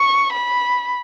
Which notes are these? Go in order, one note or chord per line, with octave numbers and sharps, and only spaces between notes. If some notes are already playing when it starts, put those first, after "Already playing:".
Already playing: C#6
B5